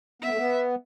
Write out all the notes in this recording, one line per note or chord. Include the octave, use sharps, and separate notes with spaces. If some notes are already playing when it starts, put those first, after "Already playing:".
B3 E5
A3
B3